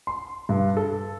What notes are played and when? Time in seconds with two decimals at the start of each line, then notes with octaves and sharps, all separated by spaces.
0.07 C6
0.49 G2
0.77 A4